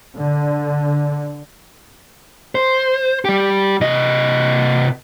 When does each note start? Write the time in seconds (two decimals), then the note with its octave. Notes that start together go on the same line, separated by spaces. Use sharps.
0.18 D3
2.55 C5
3.25 G3 G4
3.81 C3 D#5